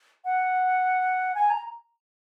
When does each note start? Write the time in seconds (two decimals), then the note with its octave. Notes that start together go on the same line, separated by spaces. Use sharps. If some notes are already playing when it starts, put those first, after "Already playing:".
0.25 F#5
1.35 G#5
1.50 A#5